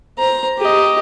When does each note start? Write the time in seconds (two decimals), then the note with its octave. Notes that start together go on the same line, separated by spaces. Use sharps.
0.18 C5 A#5
0.58 G4 D#5